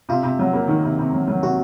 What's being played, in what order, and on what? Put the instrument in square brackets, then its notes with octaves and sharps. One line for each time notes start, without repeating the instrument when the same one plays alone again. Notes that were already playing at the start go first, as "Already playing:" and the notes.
[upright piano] C3 [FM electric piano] F4
[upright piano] C3
F#3
A#3
D#3
C3
C3
F#3
F#3
[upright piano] C3 [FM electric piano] F#4